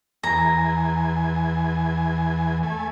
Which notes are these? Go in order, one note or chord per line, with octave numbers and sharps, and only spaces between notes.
E2 G#5 A#5
A3 G#5